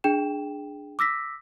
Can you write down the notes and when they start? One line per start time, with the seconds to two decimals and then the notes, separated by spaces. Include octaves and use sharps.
0.04 D4 G#4 G5 E7
0.99 D6 E6 A#6 B6